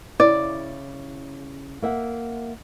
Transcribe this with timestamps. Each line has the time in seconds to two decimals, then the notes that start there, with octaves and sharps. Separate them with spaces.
0.20 C#3 E4 D5
1.82 A#3 E5 F#5